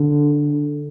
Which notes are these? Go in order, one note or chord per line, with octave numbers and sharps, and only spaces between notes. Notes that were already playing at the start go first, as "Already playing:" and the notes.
Already playing: D3